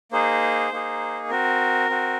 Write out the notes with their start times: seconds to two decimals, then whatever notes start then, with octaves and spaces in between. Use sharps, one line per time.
0.12 A#3 D#4 G#4 C5
0.72 A#3 D#4 G#4
1.30 C4 F#4 A#4
1.89 C4 F#4